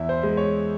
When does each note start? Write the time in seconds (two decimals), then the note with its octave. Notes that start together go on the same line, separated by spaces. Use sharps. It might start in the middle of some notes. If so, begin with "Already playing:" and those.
Already playing: E2 E5
0.09 C5
0.23 G#3
0.37 C#5